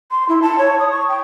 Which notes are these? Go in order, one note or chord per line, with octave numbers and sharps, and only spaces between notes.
C6
E4
A5
C#5
D#6
C#6
G5